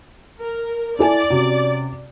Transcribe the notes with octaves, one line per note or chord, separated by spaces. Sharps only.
A#4
E4 A4 D5 G#5
C3 C#4 F#4